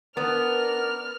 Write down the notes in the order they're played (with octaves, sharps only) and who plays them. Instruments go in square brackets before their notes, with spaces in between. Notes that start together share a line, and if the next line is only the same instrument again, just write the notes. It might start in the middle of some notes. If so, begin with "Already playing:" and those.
[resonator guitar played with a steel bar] B3 [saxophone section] D4 A#4 [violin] F6